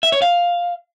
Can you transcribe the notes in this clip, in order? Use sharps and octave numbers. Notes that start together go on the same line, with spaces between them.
E5
C#5
F5